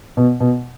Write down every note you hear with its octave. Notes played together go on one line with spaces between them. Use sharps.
B2
B2